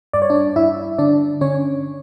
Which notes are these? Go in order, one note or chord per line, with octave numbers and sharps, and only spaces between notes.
G2 D5
C#5
D4 D5
G2 E4 E5
D3 D4 D5
D3 C#4 C#5